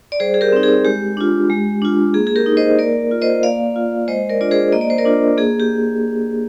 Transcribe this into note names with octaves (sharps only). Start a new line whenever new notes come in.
D5
G3 G#4 C5
G#4
G4 A#4
C4 D#4
G#4
G#3 G4
D4 F4
G#3
D4 F4
A#3 G#4
G#4
G4 A#4
D#4
C5 D#5
A#3 A#4 D5
F4
C5 D#5
A#3 D5 F5
F4
G#3 C5 D#5
A#4 D5
D4 F4 D5
G#4 C5
A#3 D#5
D5
C5
A#4 D5
D4 F4
A#3 G#4
G4